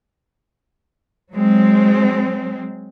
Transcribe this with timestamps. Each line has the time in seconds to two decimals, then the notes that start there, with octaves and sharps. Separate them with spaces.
1.33 F#3 G#3 C4